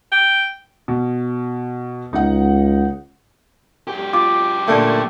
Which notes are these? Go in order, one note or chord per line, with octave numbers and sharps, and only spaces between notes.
G5
B2
C#2 D#4 F#5
F#2 G4
F4 D6
A#2 D3 A3 A#3